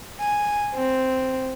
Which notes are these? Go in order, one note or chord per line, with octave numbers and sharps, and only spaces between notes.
G#5
C4